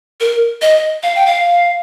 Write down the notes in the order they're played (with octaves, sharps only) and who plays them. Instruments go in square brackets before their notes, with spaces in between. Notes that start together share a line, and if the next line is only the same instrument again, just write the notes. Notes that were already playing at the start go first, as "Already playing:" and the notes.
[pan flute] A#4
D#5
F5
G5
F5